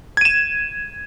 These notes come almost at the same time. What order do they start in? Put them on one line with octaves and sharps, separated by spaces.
G#6 D#7 E7